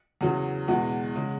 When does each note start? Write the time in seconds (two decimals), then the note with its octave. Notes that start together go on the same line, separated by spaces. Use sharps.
0.21 E2 C#3 F#3
0.68 E2 B2 G#3 F#5
1.16 C#3 G#3